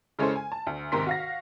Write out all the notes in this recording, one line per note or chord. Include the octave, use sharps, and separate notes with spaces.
C#3 G#3 C#4 E4 A4 C5
G#5
A5
D2
D#2 G#2 C3 A#4 C6 B6
F#4 F5 A#6